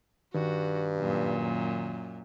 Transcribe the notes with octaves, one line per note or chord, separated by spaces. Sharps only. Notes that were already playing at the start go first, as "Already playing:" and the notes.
G2 D#3 F#4
F#2 A#2